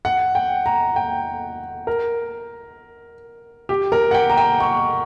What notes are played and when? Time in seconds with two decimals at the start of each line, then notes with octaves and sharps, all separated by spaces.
0.05 F#5
0.35 G5
0.66 A#5
0.96 G5
1.87 A#4
3.69 G4
3.92 A#4
4.11 F#5
4.14 G5
4.30 A#5
4.37 G5
4.60 C#6